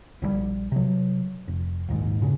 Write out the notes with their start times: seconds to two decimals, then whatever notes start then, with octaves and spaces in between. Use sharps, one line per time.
0.22 A#1 C#3 G3
0.72 C3 F#3
1.48 F1
1.89 A#1 D#2 G#2
2.22 G2 A#2 C#3